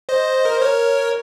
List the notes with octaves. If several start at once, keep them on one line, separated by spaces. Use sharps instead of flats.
C5 D#5
A#4
C5
A#4 C#5